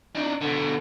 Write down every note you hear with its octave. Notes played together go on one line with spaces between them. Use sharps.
D4 D#4
B2 D3